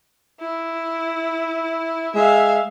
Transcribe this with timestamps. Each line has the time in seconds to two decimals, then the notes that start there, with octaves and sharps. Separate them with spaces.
0.41 E4
2.15 G#3 E5 F5